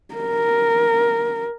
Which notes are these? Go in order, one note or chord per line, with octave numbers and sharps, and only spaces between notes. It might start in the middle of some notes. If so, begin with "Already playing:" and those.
A#4